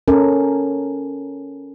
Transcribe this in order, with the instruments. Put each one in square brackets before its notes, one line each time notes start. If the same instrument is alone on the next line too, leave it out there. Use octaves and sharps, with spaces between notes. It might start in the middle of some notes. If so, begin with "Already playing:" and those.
[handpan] C#4 A4 A#4